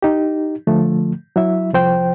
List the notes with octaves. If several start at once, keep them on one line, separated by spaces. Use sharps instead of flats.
D#4 G4
D3 F3 A3
F#3 E4 E5
C2 F3 C5 G5